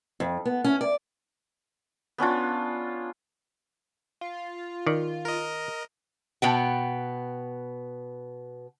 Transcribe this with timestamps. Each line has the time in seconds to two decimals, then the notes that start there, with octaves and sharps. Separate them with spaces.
0.20 F2
0.45 B3
0.64 C#4
0.81 D5
2.18 B3 C#4 D4 F4
4.21 F4
4.87 D#3 D5
5.25 A#4 D#5
6.42 B2 B3 G5